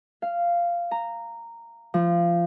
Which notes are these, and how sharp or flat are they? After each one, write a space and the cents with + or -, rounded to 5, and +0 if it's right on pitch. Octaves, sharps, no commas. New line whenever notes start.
F5 -10
A#5 -10
F3 -20